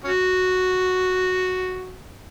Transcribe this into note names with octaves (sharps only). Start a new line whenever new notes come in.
C#4 F#4